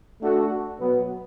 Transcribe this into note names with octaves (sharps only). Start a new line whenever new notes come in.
A3 D4 F#4 A4
B2 F#3 B3